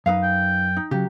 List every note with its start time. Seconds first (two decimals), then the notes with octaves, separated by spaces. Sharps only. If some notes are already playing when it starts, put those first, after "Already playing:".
0.06 F#2 D#4 B4 F5
0.23 G5
0.77 D#4
0.91 C#3 F#3 G4